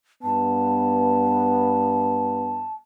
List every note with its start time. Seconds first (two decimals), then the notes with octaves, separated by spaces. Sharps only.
0.23 G2 B3 A5